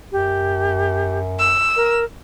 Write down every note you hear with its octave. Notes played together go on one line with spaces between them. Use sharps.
F#2 G4
E6
A#4